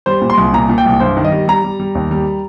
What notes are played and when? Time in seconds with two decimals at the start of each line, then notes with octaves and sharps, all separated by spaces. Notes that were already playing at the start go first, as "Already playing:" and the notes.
0.06 G3 C5
0.21 A#2
0.30 C6
0.37 C2
0.53 A#2 A#5
0.69 A#2
0.78 G5
0.86 C2
1.00 G2 C5
1.17 D#3
1.25 D#5
1.32 G3
1.48 G3 A#5
1.64 G3
1.80 G3
1.95 D#2
2.11 G3